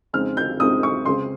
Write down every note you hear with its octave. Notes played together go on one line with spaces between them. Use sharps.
F2 C#3 G#3 C4 D#4 F6
G6
F2 C#3 G#3 C4 D#4 D#6
C#6
C#2 C#3 G#3 C4 C6